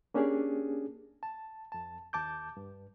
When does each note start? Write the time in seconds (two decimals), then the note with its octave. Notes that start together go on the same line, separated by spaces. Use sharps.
0.14 A#3 C#4 D4 G4 G#4
1.23 A5
1.72 F2 A5
2.13 D#2 A5 D6 G6
2.57 G2